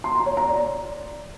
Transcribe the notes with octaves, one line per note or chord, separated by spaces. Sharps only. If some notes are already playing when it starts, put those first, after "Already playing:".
C6
A#5
C#5
A#5
D5